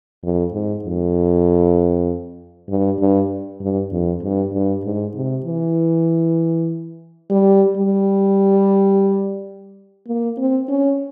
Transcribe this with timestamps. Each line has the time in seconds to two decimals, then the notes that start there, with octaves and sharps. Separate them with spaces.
0.23 F2
0.53 G#2
0.84 F2
2.69 G2
3.00 G2
3.61 G2
3.92 F2
4.23 G2
4.53 G2
4.84 G#2
5.15 C3
5.46 E3
7.30 G3
7.77 G3
10.08 A#3
10.38 C4
10.69 C#4